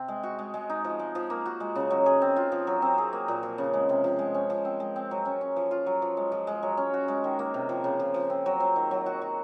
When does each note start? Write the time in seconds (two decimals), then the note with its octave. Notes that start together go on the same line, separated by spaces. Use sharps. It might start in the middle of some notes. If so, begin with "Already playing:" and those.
Already playing: C3 C4
0.08 G#3
0.23 F#4
0.39 G#3
0.54 G#3
0.70 D#4
0.84 F3
0.99 G#3
1.15 F3
1.30 A#3
1.46 F#4
1.60 G#3
1.75 C#3
1.90 F#3
2.06 G#4
2.22 C4
2.36 F4
2.52 F3
2.67 F#3
2.82 C4
2.98 G#4
3.13 A#3
3.28 A#2
3.43 F3
3.58 C#3
3.73 G#3
3.89 C3
4.04 F3
4.19 G#3
4.34 C#4
4.50 F3
4.65 C4
4.80 G#3
4.96 C4
5.11 F#3
5.25 C#4
5.41 C#4
5.56 F3
5.71 F4
5.86 F#3
6.02 F3
6.17 G#3
6.32 F3
6.47 G#3
6.63 F#3
6.77 C#4
6.94 F#4
7.08 G#3
7.24 D#3
7.39 A#3
7.54 C3
7.69 F3
7.84 C#3
8.00 F3
8.14 F3
8.30 C4
8.46 F#3
8.60 C4
8.76 D#3
8.91 F#3
9.06 F#4
9.21 F#3